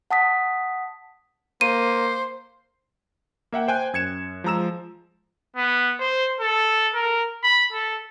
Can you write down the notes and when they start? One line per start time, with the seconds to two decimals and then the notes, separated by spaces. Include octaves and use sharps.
0.11 F#5 A5 D#6 B6
1.61 A#3 C5 D#7
3.52 A#3 E5 F#5 G5
3.68 C5 G5 G#5 F#6
3.93 F#2 G#6 C#7 E7
4.44 F3 G#3 A#5 E6 E7
5.56 B3
6.00 C5
6.40 A4
6.94 A#4
7.43 B5
7.73 A4